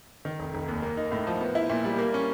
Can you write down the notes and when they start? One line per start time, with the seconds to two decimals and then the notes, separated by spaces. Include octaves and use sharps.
0.25 D#3
0.39 F1
0.54 F1
0.68 D#2
0.82 A#3
0.97 D#4
1.12 A2
1.27 F3
1.40 B3
1.55 E4
1.70 A#2
1.84 G3
1.99 A#3
2.14 C#4